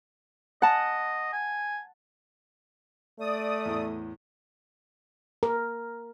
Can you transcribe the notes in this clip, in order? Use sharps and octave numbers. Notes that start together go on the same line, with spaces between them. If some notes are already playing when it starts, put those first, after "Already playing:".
D#5 F#5 A5
G#5
A3 D5 D#6
E2 A2
A#4